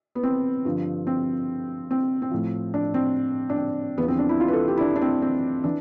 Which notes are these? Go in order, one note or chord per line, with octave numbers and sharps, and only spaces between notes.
B3
C4
G2 D3 F3
C4
C4
C4
A2 F3
D4
C4
D4
C4
E2 D3 F3 B3
C4
D4
E4
F4
B4
A4
G4
E4
D4
D4
C4
C4
E3 D4